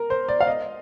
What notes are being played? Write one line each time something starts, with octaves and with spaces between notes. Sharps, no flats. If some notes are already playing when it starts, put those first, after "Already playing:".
Already playing: A#4
C5
D5
F5
D#5